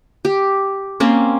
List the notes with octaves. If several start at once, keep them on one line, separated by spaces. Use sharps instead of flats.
G4
A#3 C4 C#4